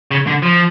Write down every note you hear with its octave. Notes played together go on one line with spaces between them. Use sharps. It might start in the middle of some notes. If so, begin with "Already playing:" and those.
C#3
D3
F3